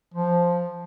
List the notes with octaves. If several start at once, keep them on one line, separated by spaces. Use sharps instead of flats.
F3